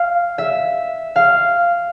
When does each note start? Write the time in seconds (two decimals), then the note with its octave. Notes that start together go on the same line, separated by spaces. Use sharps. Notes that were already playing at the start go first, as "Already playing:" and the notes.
Already playing: F5
0.38 E5
1.16 F5